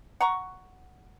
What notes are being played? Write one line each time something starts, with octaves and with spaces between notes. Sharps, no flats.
F#5 A#5 C#6